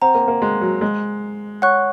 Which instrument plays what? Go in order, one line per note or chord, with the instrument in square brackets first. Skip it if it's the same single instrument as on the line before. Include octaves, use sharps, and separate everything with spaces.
[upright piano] C4 [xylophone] C5 F#5 A#5
[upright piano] A#3
A#3
G#3
F#3
G#3
[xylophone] C#5 F#5 C#6 F#6